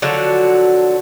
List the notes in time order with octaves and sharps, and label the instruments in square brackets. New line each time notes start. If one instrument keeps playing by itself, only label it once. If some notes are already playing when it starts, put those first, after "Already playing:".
[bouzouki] D3 F3 F#3 F#4